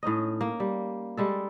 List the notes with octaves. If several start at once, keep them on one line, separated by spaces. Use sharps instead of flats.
A2 C#4 D#4 D#5
A#3
G3
G3 G#3 A4